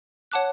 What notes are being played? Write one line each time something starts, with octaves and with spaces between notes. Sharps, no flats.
C#5 F#5 A5 D6 F#6